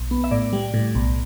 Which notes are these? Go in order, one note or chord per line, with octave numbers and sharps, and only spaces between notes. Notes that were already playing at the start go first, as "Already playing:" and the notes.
Already playing: B1
B3
E5
A2 D5
G3
A2
B1